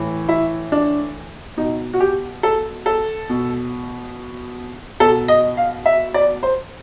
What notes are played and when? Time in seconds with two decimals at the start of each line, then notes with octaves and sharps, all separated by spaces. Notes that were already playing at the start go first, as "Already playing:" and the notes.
Already playing: A2 E3
0.29 E4
0.72 D4
1.57 B2 D#4
1.94 F#4
2.00 G4
2.43 A4
2.86 A4
3.30 B2
5.00 B2 A4
5.28 D#5
5.57 F5
5.86 E5
6.14 D5
6.43 C5